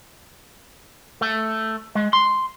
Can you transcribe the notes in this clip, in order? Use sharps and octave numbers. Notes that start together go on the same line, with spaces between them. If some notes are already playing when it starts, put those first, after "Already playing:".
A3
G#3
C6